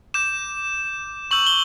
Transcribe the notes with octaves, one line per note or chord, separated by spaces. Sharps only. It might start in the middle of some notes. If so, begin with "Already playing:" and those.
D6 G6 E7
C#6 E6 G6 F#7
G7